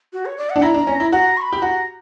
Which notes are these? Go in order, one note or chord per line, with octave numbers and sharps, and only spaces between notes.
F#4
C#5
D5
F#5
D4
E4 A#5
D4
C#4
E4
F#4 A#5
C#6
B5
G4
F#4 A#5